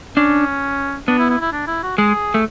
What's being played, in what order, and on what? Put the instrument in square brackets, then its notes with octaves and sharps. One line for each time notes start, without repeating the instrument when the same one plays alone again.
[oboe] C#4 [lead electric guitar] D4
[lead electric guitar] B3 [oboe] D4
[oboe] E4
E4
E4
D4
E4
F#4
[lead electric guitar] G#3 [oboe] G#4
[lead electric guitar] A3